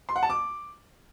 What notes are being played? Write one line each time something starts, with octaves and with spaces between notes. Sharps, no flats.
C6
F#5
A5
D6